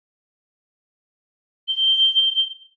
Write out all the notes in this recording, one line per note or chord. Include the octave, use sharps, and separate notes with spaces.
G7